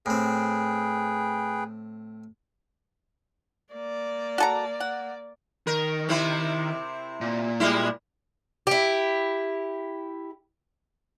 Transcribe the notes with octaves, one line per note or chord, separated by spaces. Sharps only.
A2 C4 G#4 B4 G5
A#3 D5
F#4 A4 A#5
F#5
D#3 A#4
C3 C4 E4
A#2
G3 G#3 E4
E4 G4